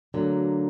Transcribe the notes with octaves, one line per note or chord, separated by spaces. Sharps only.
D2 D3 F#3 A#3